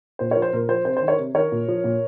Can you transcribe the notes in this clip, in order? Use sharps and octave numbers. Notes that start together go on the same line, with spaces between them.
A#2 C5
A#4 C#5
F3
C5
A#2 A#4
F3 C5
C3 C5
C5
D#3
A#4 C#5
C3
D#3 A#4 C#5
A#2
F3
A#2